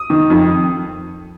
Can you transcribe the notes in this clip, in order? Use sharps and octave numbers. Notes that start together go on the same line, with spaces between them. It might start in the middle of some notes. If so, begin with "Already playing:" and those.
Already playing: D#6
D#3
F2